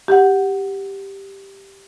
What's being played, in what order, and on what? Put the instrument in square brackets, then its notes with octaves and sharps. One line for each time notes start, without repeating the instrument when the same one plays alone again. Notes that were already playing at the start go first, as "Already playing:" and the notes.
[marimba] G4 F#5